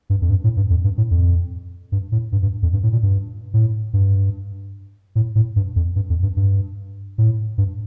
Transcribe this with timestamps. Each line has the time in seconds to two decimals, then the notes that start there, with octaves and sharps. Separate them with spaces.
0.10 G2
0.22 F2
0.30 G2
0.44 A2
0.57 G2
0.70 F2
0.84 G2
0.98 A2
1.11 F2
1.92 G2
2.12 A2
2.32 G2
2.42 G2
2.62 F2
2.73 G2
2.83 A2
2.92 A#2
3.03 G2
3.54 A2
3.93 G2
5.15 A2
5.35 A2
5.56 G2
5.76 F2
5.96 G2
6.10 F2
6.23 G2
6.37 G2
7.18 A2
7.58 G2